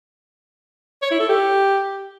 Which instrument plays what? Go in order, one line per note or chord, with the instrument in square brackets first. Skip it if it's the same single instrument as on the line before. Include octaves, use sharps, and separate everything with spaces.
[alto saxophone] C#5
E4
A4
G4